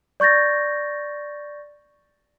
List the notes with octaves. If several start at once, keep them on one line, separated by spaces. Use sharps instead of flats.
D5 C#6 G6 A6 A#6